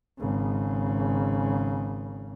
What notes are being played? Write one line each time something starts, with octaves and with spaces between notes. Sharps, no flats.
G#1 C#3